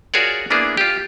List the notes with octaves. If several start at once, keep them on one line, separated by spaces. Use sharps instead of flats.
F4 F#4 G#4 A#4 C#5 D5
A#3 B3 D4 E4 G#4
F4 G4